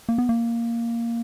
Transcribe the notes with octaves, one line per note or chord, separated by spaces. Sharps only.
A#3
B3
A#3